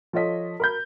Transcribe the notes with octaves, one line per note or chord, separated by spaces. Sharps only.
F3 F4 A4 C#5 D#5 B6
A#4 B5 G6